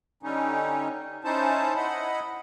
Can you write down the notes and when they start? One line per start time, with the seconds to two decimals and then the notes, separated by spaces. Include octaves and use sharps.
0.23 D3 G3 C#4 D#4
1.24 C#4 D#4 E4 C5 A5
1.76 E4 D#5 F#5 B5